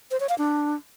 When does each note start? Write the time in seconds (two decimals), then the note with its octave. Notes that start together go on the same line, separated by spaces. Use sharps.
0.11 C5
0.20 C#5
0.29 F5
0.38 D4